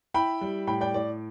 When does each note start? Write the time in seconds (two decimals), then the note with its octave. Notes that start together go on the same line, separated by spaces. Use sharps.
0.14 E4 G5 B5
0.41 G3
0.67 A2 G5 B5
0.81 D5 G5
0.94 A2 D5